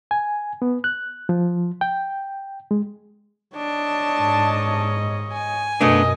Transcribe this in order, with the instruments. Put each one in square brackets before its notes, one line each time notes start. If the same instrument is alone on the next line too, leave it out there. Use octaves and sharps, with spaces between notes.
[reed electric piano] G#5
B3
F#6
F3
G5
G#3
[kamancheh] D4 A5 [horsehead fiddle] C#5 D#5
[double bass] G#2
[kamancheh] G#5
[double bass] F#2 B2 [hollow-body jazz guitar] A3 B3 D4 [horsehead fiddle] A#4 D#5